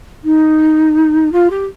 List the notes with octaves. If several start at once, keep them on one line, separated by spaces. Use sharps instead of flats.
D#4
F4
G4